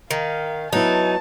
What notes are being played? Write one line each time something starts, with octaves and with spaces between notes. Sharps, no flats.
D#3 F5
F#3 B3 D#4 E4 A5